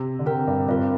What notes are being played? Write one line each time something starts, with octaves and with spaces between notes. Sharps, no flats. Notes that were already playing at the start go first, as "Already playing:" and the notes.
Already playing: C3
D3
C3 C4 A#4 G5
G2
G2 C4 F4 A#4